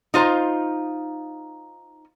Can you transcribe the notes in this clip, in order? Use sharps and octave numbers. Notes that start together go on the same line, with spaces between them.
D#4 F4 C5 A#5